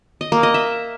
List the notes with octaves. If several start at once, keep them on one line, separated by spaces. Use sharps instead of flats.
D#5
A#3
D#5
E5